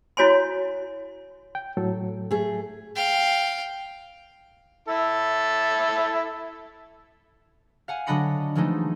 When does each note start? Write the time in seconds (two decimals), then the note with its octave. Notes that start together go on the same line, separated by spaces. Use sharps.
0.17 E4 F#4 C#5 G#5 C6
1.55 G5
1.77 A2 F#3 A4
2.31 A3 G#4
2.96 F5 G5
4.88 E4 A4
7.88 F5 F#5 G#5
8.07 D3 F#3 D4 D#5 B5 C#7
8.55 E3 F3 G#3 A3 D#4